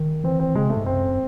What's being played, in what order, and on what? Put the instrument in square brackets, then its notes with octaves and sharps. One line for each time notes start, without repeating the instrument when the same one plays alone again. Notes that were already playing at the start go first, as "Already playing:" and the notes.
Already playing: [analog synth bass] D#3
[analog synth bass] E3 [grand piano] C4
[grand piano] C4
[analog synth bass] C#3 [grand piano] G#3
[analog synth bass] C3 [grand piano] A3
[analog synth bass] G#2
[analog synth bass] F#2 [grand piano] C4